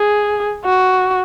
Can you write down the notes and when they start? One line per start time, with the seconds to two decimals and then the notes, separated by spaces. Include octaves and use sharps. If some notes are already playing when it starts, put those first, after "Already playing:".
Already playing: G#4
0.65 F#4